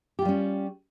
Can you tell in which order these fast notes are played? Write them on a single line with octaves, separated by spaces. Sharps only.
G4 F4 G3 C#4